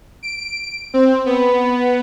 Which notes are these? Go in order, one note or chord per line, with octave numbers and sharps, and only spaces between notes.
D7
C4
B3